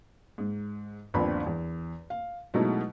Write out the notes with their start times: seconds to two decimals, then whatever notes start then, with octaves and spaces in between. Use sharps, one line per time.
0.38 G#2
1.14 G1 D#2 F3 C4 D4 B5
1.46 E2
2.10 F5
2.54 B2 F#3 G#3 A3 D#4 E4